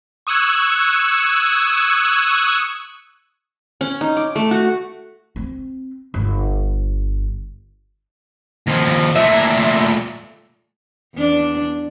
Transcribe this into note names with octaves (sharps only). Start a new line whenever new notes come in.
C#6 D#6 E6 F#6 G#6
C#4
D#4
D6
A3
F#4
C4
G1
D#2 F3
A#2 A3 E5
E2 D4